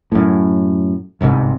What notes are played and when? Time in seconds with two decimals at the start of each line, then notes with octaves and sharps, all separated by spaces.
0.12 F#2 A2
1.21 G1 C2 G#2 C3